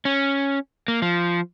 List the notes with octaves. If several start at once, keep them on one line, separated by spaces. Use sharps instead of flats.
C#4
A#3
F3